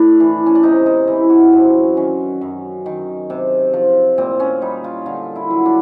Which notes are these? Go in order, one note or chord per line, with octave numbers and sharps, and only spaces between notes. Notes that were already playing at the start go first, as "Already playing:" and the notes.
Already playing: A2 D4
E3
C#4
D4
C3 D#4
D#4
E3 E4
F#4
F#2 C4
D#3 C#4
F#2
D#3
C3
F3
A#2 C4
C#4
G3 D#4
F4
D3 F4
E4
F#3
D4